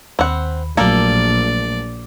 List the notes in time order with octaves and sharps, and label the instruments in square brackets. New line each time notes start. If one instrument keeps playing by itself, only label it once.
[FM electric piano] D#2 B5 [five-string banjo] C4 F#5
[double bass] A#1 [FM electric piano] F#3 A3 [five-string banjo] A#3 A4 [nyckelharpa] D5